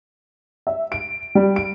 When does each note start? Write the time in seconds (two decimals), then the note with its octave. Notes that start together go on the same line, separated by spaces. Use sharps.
0.67 E5
0.92 D7
1.35 G3
1.56 D7